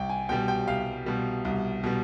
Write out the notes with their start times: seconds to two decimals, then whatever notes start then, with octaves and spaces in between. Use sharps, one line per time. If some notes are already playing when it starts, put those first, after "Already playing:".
Already playing: C2 G5
0.10 G#5
0.29 B2 G3 G5
0.48 G5
0.67 C2 F5
1.06 B2 G3
1.45 C2
1.83 B2 G3